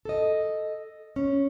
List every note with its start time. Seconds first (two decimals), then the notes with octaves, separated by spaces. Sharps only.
0.05 A4 D#5
1.16 C#4